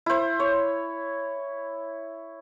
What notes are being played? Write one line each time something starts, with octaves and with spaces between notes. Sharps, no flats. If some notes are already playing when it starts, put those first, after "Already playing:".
E4 C5
C#5